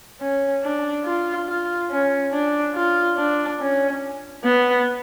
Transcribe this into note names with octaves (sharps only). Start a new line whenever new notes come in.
C#4
D4
F4
F4
C#4
D4
F4
D4
C#4
B3